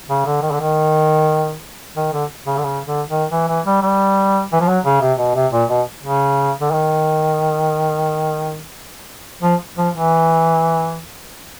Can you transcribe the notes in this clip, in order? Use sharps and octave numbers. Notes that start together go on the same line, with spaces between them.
C#3
D3
D#3
D3
D#3
D#3
D3
C#3
D3
C#3
D3
D#3
E3
E3
G3
G3
E3
F3
F#3
C#3
C3
B2
C3
A#2
B2
C#3
D3
D#3
F3
F3
E3